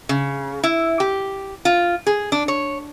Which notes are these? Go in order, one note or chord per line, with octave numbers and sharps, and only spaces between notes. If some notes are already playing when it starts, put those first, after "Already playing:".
C#3
E4
G4
F4
G#4
D4
C#5